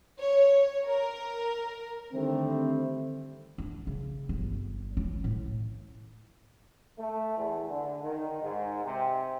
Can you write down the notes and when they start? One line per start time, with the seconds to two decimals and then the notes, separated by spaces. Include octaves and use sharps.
0.19 C#5
0.86 A#4
2.13 D3 D#3 G3 A3 C4
3.58 D4
3.87 C#3
4.29 G1
4.97 C#4
5.24 A2
6.98 A3
7.37 E2
7.68 D3
8.03 D#3
8.40 G#2
8.84 C3